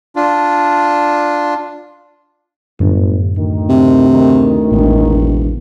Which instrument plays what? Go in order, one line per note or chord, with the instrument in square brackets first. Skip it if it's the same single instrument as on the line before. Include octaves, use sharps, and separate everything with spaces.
[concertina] D4 F4
[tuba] G1 [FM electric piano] F#2 A2 D3
[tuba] D2 [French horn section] D#3
[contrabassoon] C3
[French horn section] D#3
[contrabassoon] E1 [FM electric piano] A1